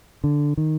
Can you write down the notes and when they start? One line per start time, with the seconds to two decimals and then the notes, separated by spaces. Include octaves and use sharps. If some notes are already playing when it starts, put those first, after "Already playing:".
0.24 D3
0.57 D#3